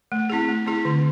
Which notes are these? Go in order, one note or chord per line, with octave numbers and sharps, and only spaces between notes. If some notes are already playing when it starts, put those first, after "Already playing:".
A3
C4 E4 G#4
A3
C4 E4 G#4
D3